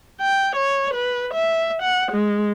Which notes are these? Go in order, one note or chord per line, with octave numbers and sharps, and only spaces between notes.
G5
C#5
B4
E5
F#5
G#3